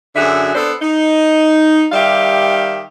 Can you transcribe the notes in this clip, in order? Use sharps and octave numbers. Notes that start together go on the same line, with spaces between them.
F#2 D3 F#4 G#4 E5
B3 D4 A4 C5
D#4
D#3 G3 G4 E5 F5